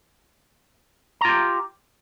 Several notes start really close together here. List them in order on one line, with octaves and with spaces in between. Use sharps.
A#5 F4 G4